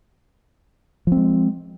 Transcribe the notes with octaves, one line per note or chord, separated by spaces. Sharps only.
F3 G#3 C4